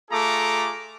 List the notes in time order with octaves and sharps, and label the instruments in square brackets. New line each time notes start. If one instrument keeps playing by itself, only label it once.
[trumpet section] A3 F4 G#4 A4 A#5 D6